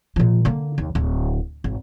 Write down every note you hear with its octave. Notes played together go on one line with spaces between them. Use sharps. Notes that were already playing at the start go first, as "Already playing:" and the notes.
A#2 F3
D3 A#3
D#2
D1
G#1